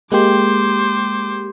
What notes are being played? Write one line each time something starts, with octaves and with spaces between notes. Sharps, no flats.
G#3 A#3 G4 C5 D6